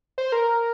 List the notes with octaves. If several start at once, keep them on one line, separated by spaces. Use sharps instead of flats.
C5
A#4